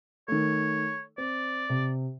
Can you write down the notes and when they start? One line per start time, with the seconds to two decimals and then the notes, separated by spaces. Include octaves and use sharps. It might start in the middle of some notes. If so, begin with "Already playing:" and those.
0.28 D#3 A3 C#5
1.18 C4 D5
1.69 C3